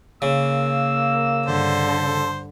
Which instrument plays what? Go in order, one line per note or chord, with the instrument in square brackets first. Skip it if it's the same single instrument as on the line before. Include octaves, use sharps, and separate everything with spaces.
[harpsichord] C#3 [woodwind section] A#3 E6
[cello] G2 D3 [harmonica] A4 C5